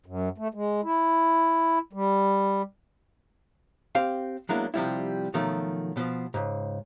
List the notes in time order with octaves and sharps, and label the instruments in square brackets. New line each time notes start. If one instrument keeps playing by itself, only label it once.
[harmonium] F#2
A3
G#3
E4
G3
[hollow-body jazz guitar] C4 G4 F5
F#3 G#3 A#3 B3 D4 E4
C3 F3 G3 E4
B2 D#3 F3 F#3 A3
B2 F3
C#2 G#2